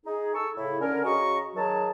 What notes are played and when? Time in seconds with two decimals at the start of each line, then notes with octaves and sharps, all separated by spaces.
0.06 D#4 G#4
0.35 A4 A5 C#6 E6
0.56 A2 C#3 E4
0.80 D3 C#4 A#4
1.05 C#3 F#4 D#5 A#5 C#6
1.56 D#3 F#3 G#4 A5